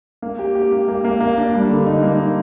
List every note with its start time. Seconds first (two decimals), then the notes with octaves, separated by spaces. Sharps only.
0.22 A#3
0.39 G4
0.55 G4
0.72 A#3
0.88 A#3
1.04 A#3
1.20 A#3
1.38 D4
1.54 G3
1.70 D3
1.86 D#4
2.03 A#3
2.19 D#4